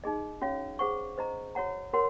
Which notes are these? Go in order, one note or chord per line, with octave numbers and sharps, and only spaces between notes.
D#4 G#4 D#5
C#4 F#4 C#5 F5
G#4 C5 F#5 C#6
C5 D#5 A#5
F#4 C#5 F#5 A#5
F#4 A#4 C#5 F#5 C6